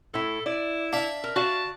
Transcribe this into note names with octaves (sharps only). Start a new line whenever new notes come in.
A2 E4 A4
E4 D5
D4 E5 F5
A#4
F#4 D5 F5 A5